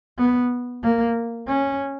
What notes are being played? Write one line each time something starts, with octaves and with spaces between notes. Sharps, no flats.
B3
A#3
C#4